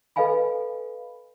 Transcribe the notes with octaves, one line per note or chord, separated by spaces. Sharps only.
A4 B4 D#5 F5 G#5 B5